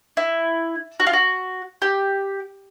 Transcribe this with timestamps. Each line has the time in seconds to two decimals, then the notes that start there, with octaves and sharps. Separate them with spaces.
0.17 E4
1.00 F#4
1.07 F4
1.13 F#4
1.82 G4